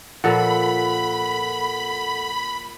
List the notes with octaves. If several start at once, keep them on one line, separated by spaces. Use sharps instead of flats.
A#2 F3 A#3 A4 F#5 B5